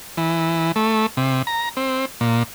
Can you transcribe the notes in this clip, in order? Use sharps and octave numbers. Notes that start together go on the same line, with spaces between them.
E3
A3
C3
A#5
C4
A#2